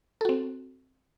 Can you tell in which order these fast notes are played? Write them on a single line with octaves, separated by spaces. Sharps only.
A4 F#4 C4